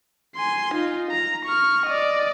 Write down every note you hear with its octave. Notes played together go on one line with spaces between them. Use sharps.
G#5 C6
D#4 F4
A#5
C#6 F6
D5 D#5